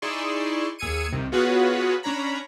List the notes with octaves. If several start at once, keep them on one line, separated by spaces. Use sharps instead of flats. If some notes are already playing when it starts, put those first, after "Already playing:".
D#4 E4 G#4 D5 C6 C#6
D#2 G#4 E6 G#6 C#7 D#7
C2 C3 D#3
B3 F4 F#4 G#4 B4 C#5
C#4 D4 C#5 A#5 B5